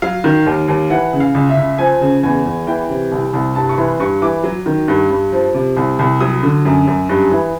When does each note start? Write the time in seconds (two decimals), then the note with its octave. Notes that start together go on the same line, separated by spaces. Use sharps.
0.02 F#3 F5
0.24 D#3
0.46 D#2
0.68 D#2
0.90 E3 F#5
1.13 C#3
1.20 F5
1.35 C#2
1.49 E5
1.57 C#2
1.78 F3 G#5
2.01 C#3
2.23 E2 G#5
2.46 E2
2.67 E3 G5
2.90 C3
3.12 C2
3.33 C2
3.55 G2 A5
3.69 C#6
3.78 E3 C6
4.00 G2 C#6
4.22 E3 D6
4.44 F#3
4.66 D#3
4.88 G2
5.11 G2
5.32 F3
5.54 C3
5.77 C2
5.99 C2
6.20 F#3 D#6
6.43 D3
6.65 F#2
6.87 F#2
7.09 G2
7.31 E3